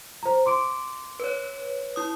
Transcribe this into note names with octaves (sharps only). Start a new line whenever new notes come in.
C5 A#5
C6 D6 D7
B4 C#5
E4 D#6